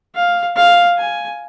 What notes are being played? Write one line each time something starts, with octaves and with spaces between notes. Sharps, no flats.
F5
F5
G#5